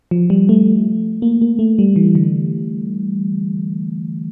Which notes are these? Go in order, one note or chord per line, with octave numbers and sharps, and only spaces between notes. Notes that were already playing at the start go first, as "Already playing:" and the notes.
F3
G3
A3
A#3
A#3
A3
G3
E3
D3